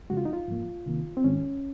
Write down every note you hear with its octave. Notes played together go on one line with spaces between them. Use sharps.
F2 C#3 F3 G#3 F#4
F4
D#4
F4
G#2 F3 A#3
C3 D#3 A#3
C4
G#2 D#3 G#3 C#4